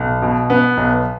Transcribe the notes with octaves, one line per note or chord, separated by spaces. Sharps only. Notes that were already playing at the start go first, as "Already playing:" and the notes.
Already playing: B1
B2
B3
B1